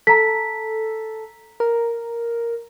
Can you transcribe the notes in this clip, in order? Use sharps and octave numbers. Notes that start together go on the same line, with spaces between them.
A4 A#5 B6
A#4